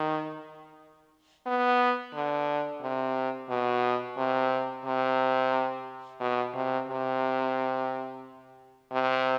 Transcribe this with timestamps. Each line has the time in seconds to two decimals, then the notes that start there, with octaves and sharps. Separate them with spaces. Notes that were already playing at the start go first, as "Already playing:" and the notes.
Already playing: D#3
1.47 B3
2.14 D3
2.82 C3
3.49 B2
4.17 C3
4.85 C3
6.20 B2
6.54 C3
6.89 C3
8.92 C3